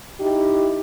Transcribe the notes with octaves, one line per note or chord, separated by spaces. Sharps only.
D#4 E4 G4